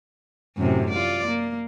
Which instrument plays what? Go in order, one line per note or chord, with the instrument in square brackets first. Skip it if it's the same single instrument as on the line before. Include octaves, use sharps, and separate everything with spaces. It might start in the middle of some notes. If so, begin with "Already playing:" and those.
[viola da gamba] F#2 A2 C3
F4 D5
A#3